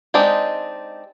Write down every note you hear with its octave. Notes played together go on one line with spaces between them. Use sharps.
G#3 C4 D4 D#4 G4